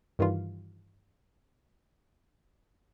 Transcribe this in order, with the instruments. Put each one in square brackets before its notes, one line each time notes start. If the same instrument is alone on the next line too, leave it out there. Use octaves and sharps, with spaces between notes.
[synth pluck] G2 D#3 E3 G3 F4